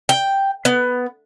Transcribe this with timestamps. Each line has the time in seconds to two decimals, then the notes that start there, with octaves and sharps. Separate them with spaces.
0.09 G5
0.65 B3